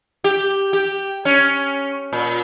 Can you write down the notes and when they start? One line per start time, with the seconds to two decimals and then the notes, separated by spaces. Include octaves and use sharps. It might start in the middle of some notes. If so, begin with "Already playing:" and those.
0.24 G4
0.73 G4
1.25 C#4
2.13 A#2